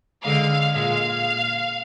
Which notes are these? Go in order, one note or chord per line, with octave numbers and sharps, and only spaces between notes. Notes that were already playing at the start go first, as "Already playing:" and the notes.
D3 G#3 F5
A#2 G#3 F5